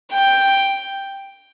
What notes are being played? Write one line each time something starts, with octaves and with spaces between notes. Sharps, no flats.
G5